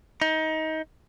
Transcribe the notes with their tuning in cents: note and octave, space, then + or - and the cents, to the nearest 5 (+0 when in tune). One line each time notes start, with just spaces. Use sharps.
D#4 +25